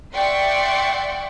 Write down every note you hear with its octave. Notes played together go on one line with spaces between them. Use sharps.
D5 E5 F#5 G5 C6 C#6